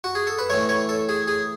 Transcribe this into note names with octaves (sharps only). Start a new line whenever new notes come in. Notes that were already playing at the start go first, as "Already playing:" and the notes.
F#4
G#4
A4
B4
A2 E3 A3 C#5
C#5
A4
G#4
G#4